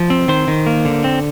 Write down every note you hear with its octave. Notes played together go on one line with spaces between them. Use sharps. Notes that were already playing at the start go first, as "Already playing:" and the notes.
Already playing: F3
C4
D#3 C5 C6
D#3
A#3
D3
C4